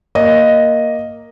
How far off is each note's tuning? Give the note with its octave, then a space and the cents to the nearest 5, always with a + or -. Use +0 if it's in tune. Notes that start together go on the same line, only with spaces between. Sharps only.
A#3 +0 D#5 +0